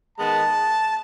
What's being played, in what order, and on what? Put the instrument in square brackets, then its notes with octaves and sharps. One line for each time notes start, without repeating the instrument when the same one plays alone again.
[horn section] D#3 G#3 B3 A5